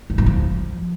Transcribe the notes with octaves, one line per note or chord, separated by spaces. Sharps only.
F#3
G2
F3